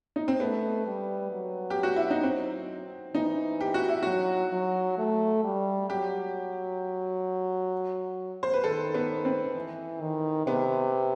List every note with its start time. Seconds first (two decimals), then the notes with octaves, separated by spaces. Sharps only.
0.16 D#4
0.28 C4
0.40 A3 B3
0.86 G3
1.32 F#3
1.70 G4
1.83 F#4
1.96 E4
2.10 D#4
2.23 C4
3.15 E3 D#4
3.61 G4
3.74 F#4
3.89 E4
4.03 F#3 F#4
4.52 F#3
4.98 A3
5.44 G3
5.90 F#3 G4
8.43 C5
8.54 B4
8.64 D#3 A4
8.94 B3
9.25 C4
9.56 E3
10.01 D#3
10.47 C3 B3